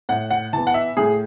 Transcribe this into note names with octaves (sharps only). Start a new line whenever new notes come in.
A2 F#5
F#5
E3 B3 A5
F#5
E5
A2 G#4